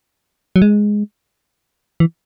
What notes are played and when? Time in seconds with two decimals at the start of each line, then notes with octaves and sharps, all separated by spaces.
0.56 F#3
0.62 G#3
2.00 E3